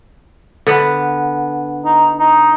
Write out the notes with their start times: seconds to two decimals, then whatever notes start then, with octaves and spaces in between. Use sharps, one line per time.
0.67 D3 B3
1.85 D#4
2.19 D#4